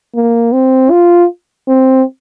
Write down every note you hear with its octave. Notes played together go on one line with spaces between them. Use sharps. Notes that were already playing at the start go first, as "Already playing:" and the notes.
A#3
C4
F4
C4